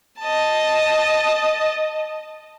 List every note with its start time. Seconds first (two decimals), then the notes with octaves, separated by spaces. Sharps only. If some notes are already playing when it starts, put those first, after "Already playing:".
0.19 D#5 A5